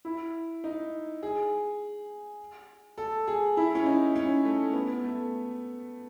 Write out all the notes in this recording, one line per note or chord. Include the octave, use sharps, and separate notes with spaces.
E4
D#4
G#4
A4
G#4
E4
C#4
D#4
C#4
A3
B3
A3